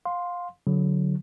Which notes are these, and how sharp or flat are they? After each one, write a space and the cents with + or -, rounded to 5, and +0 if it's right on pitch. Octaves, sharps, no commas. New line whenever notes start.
F5 +20 C6 +0
D3 -30 F#3 -10